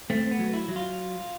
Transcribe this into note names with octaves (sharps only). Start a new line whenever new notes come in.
A3 C4
B3
F#3
E4
F#3
F4